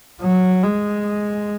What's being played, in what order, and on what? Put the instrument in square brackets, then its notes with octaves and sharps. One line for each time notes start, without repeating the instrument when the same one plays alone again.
[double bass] F#3
G#3